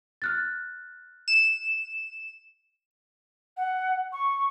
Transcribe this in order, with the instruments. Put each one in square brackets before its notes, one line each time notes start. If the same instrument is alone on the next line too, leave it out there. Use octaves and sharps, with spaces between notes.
[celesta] F6 F#6 A6
[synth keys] E7
[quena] F#5
C#6